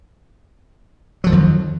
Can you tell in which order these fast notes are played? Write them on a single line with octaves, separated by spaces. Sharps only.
F#3 F3 D#3 F2